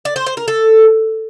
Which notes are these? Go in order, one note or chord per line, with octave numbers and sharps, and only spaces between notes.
D5
C5
C5
A#4
A4